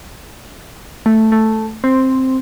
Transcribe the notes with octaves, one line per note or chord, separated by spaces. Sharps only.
A3
A3
C4